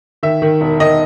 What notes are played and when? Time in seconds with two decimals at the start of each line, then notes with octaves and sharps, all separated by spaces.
0.23 D#3 E5
0.42 D#3
0.61 E1
0.80 D#3 D#5